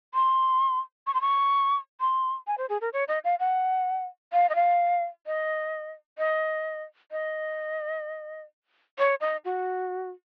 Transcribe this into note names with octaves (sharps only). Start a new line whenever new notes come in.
C6
C#6
C6
C#6
C6
G#5
C5
G#4
A#4
C#5
D#5
F5
F#5
F5
D#5
F5
D#5
D#5
D#5
C#5
D#5
F#4